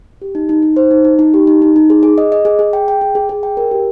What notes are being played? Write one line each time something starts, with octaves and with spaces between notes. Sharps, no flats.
G4
D#4
D#4
D#4
C5
D#4
D#4
D#4
G4
D#4
D#4
D#4
G#4
G#4
D#5
D#5
G#4
G#4
G5
G5
G#4
G#4
G#4
G5
A#4
G4